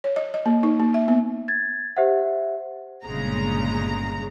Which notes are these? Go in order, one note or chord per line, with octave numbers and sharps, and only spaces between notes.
C#5
D#5
D#5
A#3
D#4
A#3
E5
B3
G#6 A6
G4 C5 E5 F#5
G1 A#2 C#3 G#3 A#5